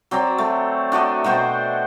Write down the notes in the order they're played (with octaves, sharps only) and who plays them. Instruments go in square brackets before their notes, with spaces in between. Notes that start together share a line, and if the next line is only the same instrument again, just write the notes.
[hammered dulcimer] F#3 C4 D5 A#5
A3
D4 F#4 D#5 E5
B2 F#4 C5 G5